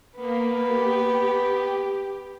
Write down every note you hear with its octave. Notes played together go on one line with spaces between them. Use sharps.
A#3 B3
G4